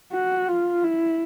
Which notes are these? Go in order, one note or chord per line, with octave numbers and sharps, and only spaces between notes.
F#4
F4
E4